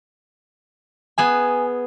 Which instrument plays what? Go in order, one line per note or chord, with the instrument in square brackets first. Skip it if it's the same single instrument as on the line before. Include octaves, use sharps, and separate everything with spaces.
[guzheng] B3 G#4 E5 [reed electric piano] G#5